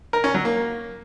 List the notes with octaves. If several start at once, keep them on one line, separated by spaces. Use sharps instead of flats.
A#4
C#4
F#3
A#3